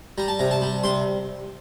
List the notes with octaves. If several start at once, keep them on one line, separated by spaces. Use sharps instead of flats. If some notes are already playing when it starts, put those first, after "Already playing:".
G3 A#5
A5
C3 A#5
A5
G3
C3 C6